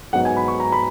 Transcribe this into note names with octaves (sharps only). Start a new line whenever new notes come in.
G#2 F#3 B3 D#4 F#5
G#5
B5
C#6
A#5
B5